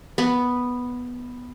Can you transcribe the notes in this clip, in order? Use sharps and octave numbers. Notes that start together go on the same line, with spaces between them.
B3